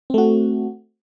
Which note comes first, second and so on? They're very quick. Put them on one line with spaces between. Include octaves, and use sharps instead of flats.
C4 A3 F#4